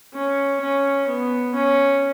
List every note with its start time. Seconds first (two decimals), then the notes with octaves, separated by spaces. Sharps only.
0.14 C#4
0.61 C#4
1.08 B3
1.54 C#4